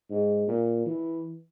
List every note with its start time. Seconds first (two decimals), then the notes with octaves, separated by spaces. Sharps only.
0.11 G#2
0.48 A#2
0.86 E3